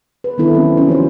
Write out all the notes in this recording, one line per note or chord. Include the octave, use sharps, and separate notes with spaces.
B4
D#3 B3 D4 E4 A4
F#3 G#3 C4 C#4
C4 C#4 F#4
F3 D4 C5